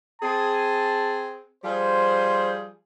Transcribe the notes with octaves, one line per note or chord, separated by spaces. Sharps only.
C4 G#4 A5
F3 G3 G#4 C5